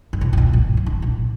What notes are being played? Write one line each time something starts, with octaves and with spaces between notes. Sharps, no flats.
G2
A#2
G2
A#2
G2
F3
D3
A#2